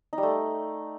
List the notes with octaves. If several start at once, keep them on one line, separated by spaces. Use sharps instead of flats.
D#4
G3
A3